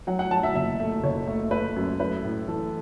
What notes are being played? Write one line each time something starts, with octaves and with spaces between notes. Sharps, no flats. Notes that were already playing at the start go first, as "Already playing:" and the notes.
F#3 F#5
F#5
F#3 A5
E5
F#1 E5
A3
F#1 C#5
A3
A3 B4
F#2
A3 B4
A2
E3 A4